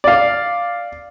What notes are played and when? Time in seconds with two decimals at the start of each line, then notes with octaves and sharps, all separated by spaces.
0.04 D5 F5